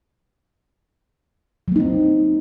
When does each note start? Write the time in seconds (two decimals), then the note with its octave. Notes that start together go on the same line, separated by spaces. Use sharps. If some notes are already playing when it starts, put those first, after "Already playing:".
1.68 F#3
1.72 A#3
1.76 D#4
1.80 C4